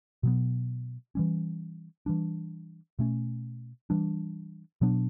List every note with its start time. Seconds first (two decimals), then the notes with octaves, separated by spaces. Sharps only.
0.23 B2 F#3 B3
1.15 E3 G3 C#4
2.06 E3 G3 D4
2.99 B2 A3 C#4
3.90 E3 G3 D4
4.81 B2 F#3 B3 D4